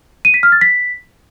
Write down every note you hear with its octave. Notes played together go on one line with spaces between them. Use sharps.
D#7
B6
F6
A6
B6